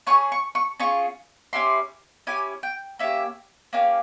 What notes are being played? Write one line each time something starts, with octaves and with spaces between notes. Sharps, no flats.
C#4 F4 G#4 C#6
C#6
C#6
C#4 F4 G#4 C#6
C#4 E4 G4 C6
C#4 E4 G4 G#5
G5
A#3 C#4 G4 E5
A#3 C#4 G4 F5